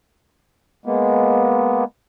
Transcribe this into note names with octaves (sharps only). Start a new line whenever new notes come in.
G#3 A#3 B3